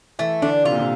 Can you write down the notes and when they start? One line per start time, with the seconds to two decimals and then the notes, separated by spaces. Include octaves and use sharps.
0.19 E3 A3
0.42 D3 D4
0.65 C3 F4
0.72 A#2
0.79 C3